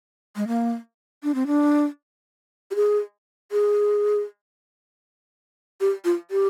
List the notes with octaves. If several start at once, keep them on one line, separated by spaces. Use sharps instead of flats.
G#3
A#3
D4
C4
D4
G4
G#4
G#4
G4
F4
G4